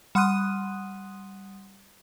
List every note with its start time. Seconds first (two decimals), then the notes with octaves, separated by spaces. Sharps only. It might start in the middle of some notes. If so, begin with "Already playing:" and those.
0.15 G3 F#5 C6 D#6 F#6 D#7